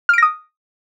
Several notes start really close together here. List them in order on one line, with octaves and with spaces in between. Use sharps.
F6 D7 A#6 D#6